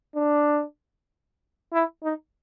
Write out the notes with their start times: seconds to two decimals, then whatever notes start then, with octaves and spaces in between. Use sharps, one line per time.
0.15 D4
1.73 E4
2.03 D#4